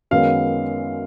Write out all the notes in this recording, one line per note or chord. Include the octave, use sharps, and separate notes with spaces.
F#2 D#3 G#3 B3 F5